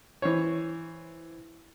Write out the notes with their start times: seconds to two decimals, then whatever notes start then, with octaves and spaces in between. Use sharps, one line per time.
0.22 E3 C5 C#5